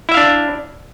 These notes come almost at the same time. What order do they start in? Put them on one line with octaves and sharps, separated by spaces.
E4 E5 F5 D4